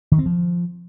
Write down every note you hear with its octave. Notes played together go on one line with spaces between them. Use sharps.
D#3
C4
F3